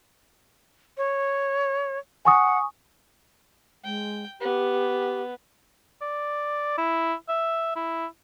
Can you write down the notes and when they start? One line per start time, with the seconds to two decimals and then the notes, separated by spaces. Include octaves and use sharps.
0.97 C#5
2.25 F#5 G#5 C#6 D#6
3.84 G#3 G5
4.41 B3 G4
6.02 D5
6.78 E4
7.29 E5
7.76 E4